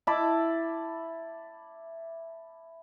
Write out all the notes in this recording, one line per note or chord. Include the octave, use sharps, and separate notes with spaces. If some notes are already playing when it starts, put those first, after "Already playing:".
E4 A5 B5 D6